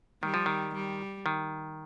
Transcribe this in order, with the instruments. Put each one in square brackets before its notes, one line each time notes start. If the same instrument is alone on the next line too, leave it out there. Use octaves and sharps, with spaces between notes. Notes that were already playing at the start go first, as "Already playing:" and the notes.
[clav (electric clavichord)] D#3 [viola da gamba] G3
[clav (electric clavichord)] F3
D#3
[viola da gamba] G3
[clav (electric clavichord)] D#3